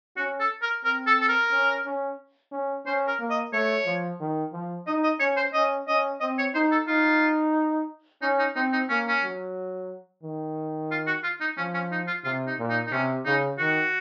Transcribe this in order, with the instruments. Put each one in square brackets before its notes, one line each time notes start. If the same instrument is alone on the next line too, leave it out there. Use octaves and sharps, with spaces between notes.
[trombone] C#4 [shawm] F#4
[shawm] A4
A#4
[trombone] C4 [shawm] A#4
[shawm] A4
A4
A#4
[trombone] C#4
C#4
C#4
[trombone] C#4 [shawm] C5
[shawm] A#4
[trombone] A#3
[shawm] D#5
[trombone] A3 [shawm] C#5
[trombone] F3
D#3
F3
[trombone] D#4 [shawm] D#5
[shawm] D#5
[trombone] C#4 [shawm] C#5
[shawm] C5
[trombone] C#4 [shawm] D#5
[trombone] C#4 [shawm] D#5
[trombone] C4 [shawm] D#5
[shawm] C#5
[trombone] D#4 [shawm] C5
[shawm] A4
[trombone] D#4 [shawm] F4
[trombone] C#4 [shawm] D#4
[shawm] D#4
[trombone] C4 [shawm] D#4
[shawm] D#4
[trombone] A#3 [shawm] C#4
[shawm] C#4
[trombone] F#3
D#3
[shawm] F4
F#4
F4
D#4
[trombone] F3 [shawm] C#4
[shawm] C#4
D#4
F4
[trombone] C3 [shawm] F4
[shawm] D#4
[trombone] A#2
[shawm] D#4
D#4
[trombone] C3 [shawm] C#4
[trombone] C#3 [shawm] D#4
[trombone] D#3 [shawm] F#4